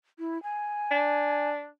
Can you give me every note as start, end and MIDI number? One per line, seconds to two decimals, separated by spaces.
0.19 0.41 64
0.43 1.49 80
0.91 1.67 62